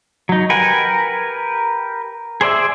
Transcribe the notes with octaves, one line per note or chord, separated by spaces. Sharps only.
F#3 D#4
G4 A#4 B4 F#5 G#5
G#4 C5 D5 E5